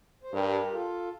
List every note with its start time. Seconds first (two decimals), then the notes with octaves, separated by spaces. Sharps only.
0.23 C5
0.32 G2 G4 A#4
0.73 F4 A4